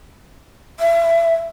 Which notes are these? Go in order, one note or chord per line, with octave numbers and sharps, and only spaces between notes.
E5